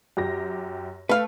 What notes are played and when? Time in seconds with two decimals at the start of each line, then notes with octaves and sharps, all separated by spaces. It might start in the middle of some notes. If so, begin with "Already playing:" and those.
0.17 F#2 G4 A#6
1.09 A3 B4 F5